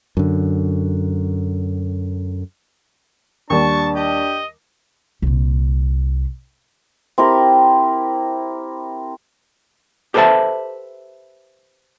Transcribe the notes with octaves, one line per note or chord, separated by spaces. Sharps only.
F#2 D3
D#2 G3 D4 A5 C#6
G4 D#5
C2 A#2
C4 E4 G4 A#4
G4 A4 B4 C5 E5 A5